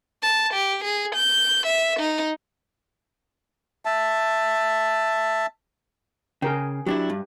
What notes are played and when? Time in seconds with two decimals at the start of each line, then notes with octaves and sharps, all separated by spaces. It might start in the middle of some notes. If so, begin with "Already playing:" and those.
0.22 A5
0.53 G4
0.84 G#4
1.15 G6
1.66 E5
1.99 D#4
3.85 E5 A5
6.42 C#3 G#4 A#4 G5
6.86 F#3 D4 E4 G4
7.10 G2